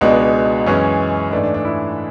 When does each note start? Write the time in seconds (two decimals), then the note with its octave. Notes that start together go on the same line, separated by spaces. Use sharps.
0.01 C#2 B2 G#3 D4
0.66 F#2 E3 G#3 C#4
1.32 G#2 E3 A3 D4
1.43 D4
1.54 D4
1.65 E4